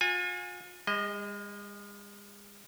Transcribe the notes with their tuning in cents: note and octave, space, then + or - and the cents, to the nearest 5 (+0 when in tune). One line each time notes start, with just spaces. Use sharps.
F4 +45 G#5 -15
G#3 -40 D#5 +10